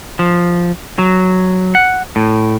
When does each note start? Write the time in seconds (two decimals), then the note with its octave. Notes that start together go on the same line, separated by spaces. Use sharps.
0.19 F3
0.98 F#3
1.75 F#5
2.16 A2